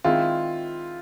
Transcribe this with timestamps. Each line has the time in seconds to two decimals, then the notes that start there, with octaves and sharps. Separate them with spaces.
0.04 D#3 G#3 C4 E4 F4